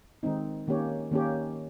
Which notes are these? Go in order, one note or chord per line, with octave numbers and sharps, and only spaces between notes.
D#3 G#3 C4 D#4
D#3 A#3 C#4 G4 C#5
D#3 A#3 C#4 G4 C#5